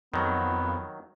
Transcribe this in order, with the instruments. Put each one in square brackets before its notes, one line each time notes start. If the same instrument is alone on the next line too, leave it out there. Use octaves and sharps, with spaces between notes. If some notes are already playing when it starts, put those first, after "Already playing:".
[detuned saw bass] F2 [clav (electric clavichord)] D#3 F#3 [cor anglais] B3